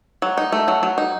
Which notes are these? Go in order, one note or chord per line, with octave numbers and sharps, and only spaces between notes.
F#3
D#4
A3
F#3
F#3
D#4